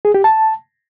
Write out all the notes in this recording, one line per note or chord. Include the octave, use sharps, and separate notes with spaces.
G#4
G4
A5